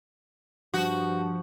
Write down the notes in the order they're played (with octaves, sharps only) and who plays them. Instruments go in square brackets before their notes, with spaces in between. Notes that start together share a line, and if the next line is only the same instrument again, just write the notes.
[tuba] G2 [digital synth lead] F3 [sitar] F#4